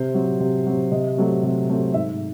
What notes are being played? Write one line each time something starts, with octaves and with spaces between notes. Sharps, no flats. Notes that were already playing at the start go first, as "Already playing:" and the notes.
Already playing: C3 C5
F#3 C4
C3
F#3 C4
C3 D#5
F#3 A3 C4
C3
F#3 A3 C4
G#2 E5